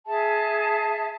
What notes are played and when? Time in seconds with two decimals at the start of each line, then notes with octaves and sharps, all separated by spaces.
0.06 G#4 E5 A5